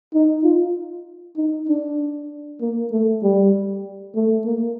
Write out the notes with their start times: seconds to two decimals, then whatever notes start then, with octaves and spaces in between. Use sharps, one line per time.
0.14 D#4
0.44 F4
1.37 D#4
1.68 D4
2.61 A#3
2.92 A3
3.23 G3
4.15 A3
4.46 A#3